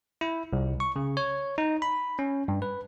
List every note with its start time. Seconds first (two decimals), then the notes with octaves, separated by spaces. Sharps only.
0.21 E4
0.53 C2
0.80 C#6
0.96 C#3
1.17 C#5
1.58 D#4
1.82 B5
2.19 C#4
2.48 G2
2.62 B4